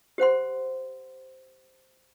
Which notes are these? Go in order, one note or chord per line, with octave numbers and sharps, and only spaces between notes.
G4 C5 F#5 C6